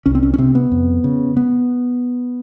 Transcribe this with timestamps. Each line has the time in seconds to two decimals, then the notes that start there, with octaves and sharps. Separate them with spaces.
0.06 C2 C#4
0.15 C4
0.23 C#4
0.34 C#4
0.38 C3 C4
0.55 B3
0.71 F2
1.04 C#3
1.37 B3